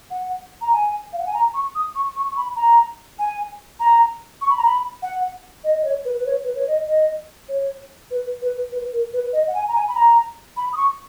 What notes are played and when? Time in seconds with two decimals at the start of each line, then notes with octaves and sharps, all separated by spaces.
0.11 F#5
0.61 A#5
0.72 G#5
1.13 F5
1.19 F#5
1.27 G#5
1.34 A#5
1.54 C#6
1.75 D#6
1.95 C#6
2.16 C#6
2.31 C#6
2.37 B5
2.56 A#5
3.19 G#5
3.80 A#5
4.41 C#6
4.50 B5
4.58 A#5
4.65 B5
5.02 F#5
5.64 D#5
5.79 D#5
5.84 C#5
6.05 B4
6.18 B4
6.26 C#5
6.44 B4
6.55 C#5
6.67 D#5
6.87 D#5
7.49 C#5
8.11 B4
8.42 B4
8.71 B4
8.93 A#4
9.13 B4
9.33 D#5
9.47 F#5
9.54 G#5
9.68 A#5
9.75 G#5
9.88 B5
9.95 A#5
10.57 B5
10.73 D#6
10.77 C#6